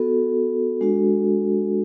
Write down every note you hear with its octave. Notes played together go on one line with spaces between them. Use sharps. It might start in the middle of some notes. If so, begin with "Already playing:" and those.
Already playing: B3 F#4 A4
G#3 D4 F#4